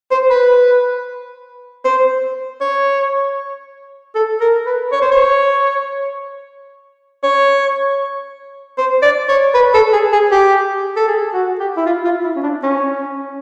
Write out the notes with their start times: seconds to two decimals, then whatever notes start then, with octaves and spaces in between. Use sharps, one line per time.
0.11 C5
0.30 B4
1.85 C5
2.61 C#5
4.15 A4
4.41 A#4
4.66 B4
4.92 C#5
5.01 C5
5.12 C#5
7.24 C#5
8.78 C5
9.02 D5
9.29 C#5
9.54 B4
9.74 A4
9.93 G#4
10.12 G#4
10.32 G4
10.96 A4
11.08 G#4
11.34 F#4
11.60 G4
11.77 E4
11.86 F4
12.05 F4
12.24 E4
12.36 C#4
12.43 D4
12.63 C#4